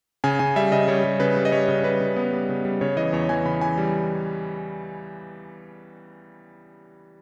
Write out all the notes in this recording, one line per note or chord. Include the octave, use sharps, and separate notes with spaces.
C#3 G#5
C#3 G#5
G3 E5
C#3 D#5
G3 C#5
G3
C#3 B4
G3
D#5
G3 C#5
C#3
G3 B4
C#3
B3
G3
C#3
G3
C#3 C#5
E3 D#5
E2 C#5
E3 G#5
C#3 B5
E3 G#5
G3